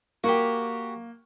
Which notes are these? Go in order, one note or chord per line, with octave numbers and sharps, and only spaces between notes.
A#3 F#4 G4